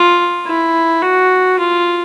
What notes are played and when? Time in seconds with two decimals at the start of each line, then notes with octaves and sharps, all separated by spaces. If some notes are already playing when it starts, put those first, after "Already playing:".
Already playing: F4
0.47 E4
1.02 F#4
1.59 F4